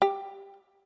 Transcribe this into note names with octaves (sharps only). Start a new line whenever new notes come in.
G4